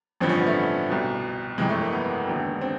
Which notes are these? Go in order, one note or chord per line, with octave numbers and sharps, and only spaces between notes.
A1 G2 D3 F3 C4
C#4
B3
A3
C2 B2
G1 F2 C3 E3 G#3
A3
A#3
B3
E1 D#2 D3
C4